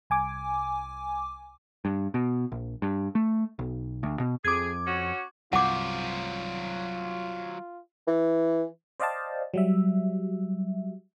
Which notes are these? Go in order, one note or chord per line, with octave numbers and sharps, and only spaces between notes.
C2 G#5 D6
G2
B2
A#1
G2
A3
B1
D2
B2
F2 G#4 D6 G#6
C#4 F#4
C2 G2 F#3 F4 C5 F#5 D6
E3
C5 D5 D#5 F5 G5 A5
F#3 G3 E5